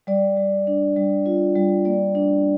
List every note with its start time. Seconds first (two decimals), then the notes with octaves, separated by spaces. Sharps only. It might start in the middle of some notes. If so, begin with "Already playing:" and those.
0.07 G3 D5
0.37 G3
0.67 D4
0.96 G3
1.26 F4
1.55 G3
1.85 A#3 D5
2.15 D4